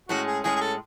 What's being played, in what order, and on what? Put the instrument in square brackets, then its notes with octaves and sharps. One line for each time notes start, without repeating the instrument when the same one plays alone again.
[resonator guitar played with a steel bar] A2 G#3 C#4 [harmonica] F#4
[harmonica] G#4
[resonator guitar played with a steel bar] A2 G#3 C#4 [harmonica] G#4
[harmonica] G#4
A4